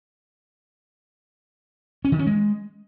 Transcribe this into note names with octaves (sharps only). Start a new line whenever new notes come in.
C#4
D#3
C#4
G#3